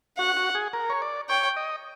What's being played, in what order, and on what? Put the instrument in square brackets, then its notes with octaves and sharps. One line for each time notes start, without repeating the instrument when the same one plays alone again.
[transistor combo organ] F#4 [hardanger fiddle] F#5
[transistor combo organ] F#4
G#4
A#4
C#5
D5
[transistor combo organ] C#5 [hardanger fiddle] G5
[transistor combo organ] D#5